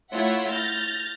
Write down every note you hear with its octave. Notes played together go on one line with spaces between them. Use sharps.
A3 E4 F4 C#5 E5 F#5
F6 G6 A6 A#6